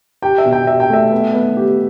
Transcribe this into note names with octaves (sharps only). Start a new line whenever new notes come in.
G4 G5
E5
B2
G5
G4 E5
G5
A3 E5
B3
B3
G4